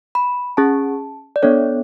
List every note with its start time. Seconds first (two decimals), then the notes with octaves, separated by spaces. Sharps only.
0.15 B5
0.57 C#4 G#4 A5
1.36 D5
1.43 B3 D4 A4 C#5